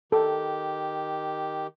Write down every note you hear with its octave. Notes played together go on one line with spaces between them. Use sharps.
D#3 G4 A4